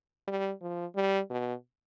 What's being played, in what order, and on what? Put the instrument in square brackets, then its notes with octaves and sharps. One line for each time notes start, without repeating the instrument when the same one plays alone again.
[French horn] G3
F3
G3
B2